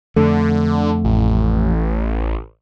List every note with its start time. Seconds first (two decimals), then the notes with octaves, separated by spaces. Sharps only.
0.16 F2 D3 A3
1.04 A1